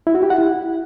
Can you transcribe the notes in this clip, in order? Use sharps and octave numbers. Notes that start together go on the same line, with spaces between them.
E4
F#4
G4
F#5
E4